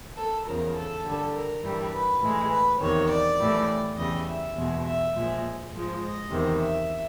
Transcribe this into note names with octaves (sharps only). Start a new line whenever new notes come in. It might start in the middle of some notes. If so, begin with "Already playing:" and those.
A4
E2 C#3 F3 A#4
A4
G2 D3 G3
A#4
G2 E3 G3
B4
A2 E3 G#3
B4
E2 C3 D#3 C#5
D5
A2 E3 G3
E2 C#3 E3 G3 D#5
E5
E2 B2 G#3
E5
A#2 F3 G#3
G#2 F3 G#3
D#5
E2 C3 D#3
E5